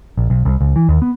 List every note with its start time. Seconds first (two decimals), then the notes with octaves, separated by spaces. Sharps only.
0.17 A#1
0.30 B1
0.45 C2
0.61 C#2
0.76 E3
0.89 D#2
1.02 B3